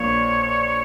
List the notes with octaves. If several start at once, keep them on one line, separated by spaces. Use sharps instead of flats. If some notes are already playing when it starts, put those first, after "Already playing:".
Already playing: A#1 A#2 A#3 D4 C#5